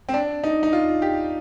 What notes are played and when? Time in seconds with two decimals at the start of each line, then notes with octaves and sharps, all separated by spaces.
0.09 C4
0.14 D4
0.44 D#4
0.63 D#4
0.73 F4
1.02 G4